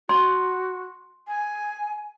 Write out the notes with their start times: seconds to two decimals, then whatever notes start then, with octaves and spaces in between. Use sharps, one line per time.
0.09 F#4 C6
1.28 G#5